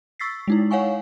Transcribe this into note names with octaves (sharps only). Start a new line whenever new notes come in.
C#6 E6 A6 B6 C7
G#3 D#4 E4
C#5 F5 F#5 G#5 C#6